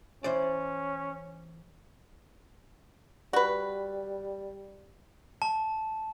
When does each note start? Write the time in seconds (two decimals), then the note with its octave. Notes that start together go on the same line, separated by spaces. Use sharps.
0.24 E3 C#4 C5 D5
3.33 G3 F#4 B4
5.42 A5